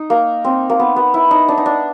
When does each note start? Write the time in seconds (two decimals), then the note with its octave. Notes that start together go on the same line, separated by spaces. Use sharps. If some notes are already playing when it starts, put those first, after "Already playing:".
Already playing: D#4
0.10 A#3
0.45 C4
0.69 A#3
0.80 B3
0.96 B3
1.14 E4
1.31 D#4
1.48 D4
1.58 D#4
1.66 D4